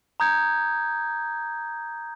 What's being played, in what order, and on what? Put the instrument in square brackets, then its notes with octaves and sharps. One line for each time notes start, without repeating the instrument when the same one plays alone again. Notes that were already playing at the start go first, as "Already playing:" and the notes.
[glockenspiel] A#5 D#6 G6 G#6